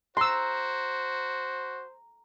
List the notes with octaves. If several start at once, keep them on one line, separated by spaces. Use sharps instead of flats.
F#4 C5 A#5 C6 E6